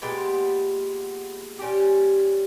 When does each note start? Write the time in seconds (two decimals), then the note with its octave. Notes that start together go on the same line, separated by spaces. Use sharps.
0.02 A#2 G#3 B3 G4
1.59 A#2 G3 C#4 G4